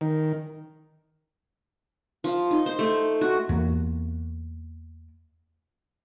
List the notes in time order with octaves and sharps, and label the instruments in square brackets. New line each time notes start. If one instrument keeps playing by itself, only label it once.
[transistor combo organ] D#3
[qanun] F3
D#4
C5
A3
F#4
[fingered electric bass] E2 A#3